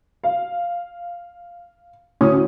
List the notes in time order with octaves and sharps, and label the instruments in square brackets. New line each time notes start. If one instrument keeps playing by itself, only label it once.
[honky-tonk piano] F5
[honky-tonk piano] D2 A2 D#6 [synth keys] C#4